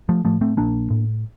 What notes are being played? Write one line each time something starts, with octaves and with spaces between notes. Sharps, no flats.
F3 A3
A2 F3 A3
A3 C4
A#1 A#3 D4
A2